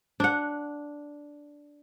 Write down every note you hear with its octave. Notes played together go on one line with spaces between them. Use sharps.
D4 F#5